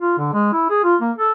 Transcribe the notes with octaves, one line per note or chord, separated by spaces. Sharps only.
F4
D3
G#3
E4
G#4
F4
A#3
A4